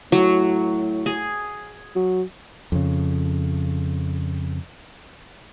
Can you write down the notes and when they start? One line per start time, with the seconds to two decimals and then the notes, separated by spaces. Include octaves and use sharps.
0.12 A2 F#3
1.06 G#4
1.96 F#3
2.72 F2 C#3